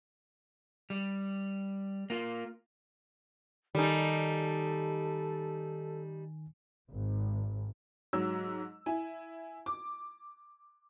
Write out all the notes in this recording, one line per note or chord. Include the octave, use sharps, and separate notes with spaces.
G3
A#3 F4
D#3 G3 D#4 A4 G#5
G#1
G#2 F#3 E6
E4 G#5
D6